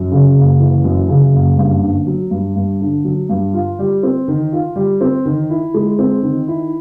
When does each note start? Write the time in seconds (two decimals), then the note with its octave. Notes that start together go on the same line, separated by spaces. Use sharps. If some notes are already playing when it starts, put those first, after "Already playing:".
Already playing: F#2
0.11 C#3
0.36 F#1
0.60 E3
0.84 F#2
1.08 C#3
1.33 F#1
1.57 G2
1.83 D3
2.07 F#3
2.31 G2
2.56 G2
2.81 D3
3.04 F#3
3.29 G2
3.54 F4
3.79 G3
4.03 C4
4.28 D#3
4.52 F4
4.76 G3
5.01 C4
5.25 D#3
5.50 E4
5.74 G#3
5.99 C4
6.23 D#3
6.48 E4